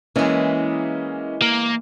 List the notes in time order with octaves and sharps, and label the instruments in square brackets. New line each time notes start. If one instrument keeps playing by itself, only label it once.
[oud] E3 G#3 [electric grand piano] A#3 C#4 D#5
[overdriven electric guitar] A#3